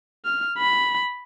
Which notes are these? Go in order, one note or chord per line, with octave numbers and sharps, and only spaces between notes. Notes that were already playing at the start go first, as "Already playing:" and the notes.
F6
B5